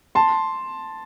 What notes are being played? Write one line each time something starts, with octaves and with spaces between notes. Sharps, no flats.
A5 C6